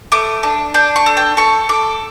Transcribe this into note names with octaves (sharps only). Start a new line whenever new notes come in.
A3 D6
D4
D4 G6
C#6
A4
G5
A4 C#6
A4 D6